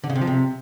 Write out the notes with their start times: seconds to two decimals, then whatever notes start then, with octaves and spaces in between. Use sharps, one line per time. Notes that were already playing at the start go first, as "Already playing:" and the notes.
0.04 D3
0.09 C#3
0.15 C3
0.21 F3
0.27 C3